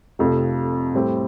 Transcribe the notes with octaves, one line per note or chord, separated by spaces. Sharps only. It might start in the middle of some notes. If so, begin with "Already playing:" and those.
F1 F2 C3 F3 A3
A2 G3 C4 G4